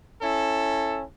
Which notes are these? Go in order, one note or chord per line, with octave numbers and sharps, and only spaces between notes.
C#4 E4 A4